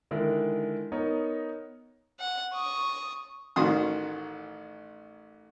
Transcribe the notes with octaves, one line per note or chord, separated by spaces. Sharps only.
D3 D#3 G#3 E4
B3 D#4 A#4 C#5 D#5
F#5
C#6 D#6
A1 D#3 C#4 F#4 C6 D#6